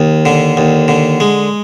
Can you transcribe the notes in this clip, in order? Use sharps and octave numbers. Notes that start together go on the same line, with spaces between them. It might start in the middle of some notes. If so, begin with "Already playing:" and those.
Already playing: D#2
D3
D#2
D3
G#3